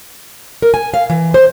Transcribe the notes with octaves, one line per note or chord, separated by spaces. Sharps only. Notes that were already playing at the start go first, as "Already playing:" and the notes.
A#4
G#5
F5
E3
C5